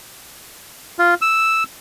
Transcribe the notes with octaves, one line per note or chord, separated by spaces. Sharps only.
F4
E6